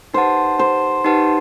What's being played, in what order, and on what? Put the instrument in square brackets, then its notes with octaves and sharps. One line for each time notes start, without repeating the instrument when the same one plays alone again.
[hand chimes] D#4 G4 B4 F#5 A5 [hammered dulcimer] C5
[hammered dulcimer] C5
[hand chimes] D#4 G4 B4 F#5 A5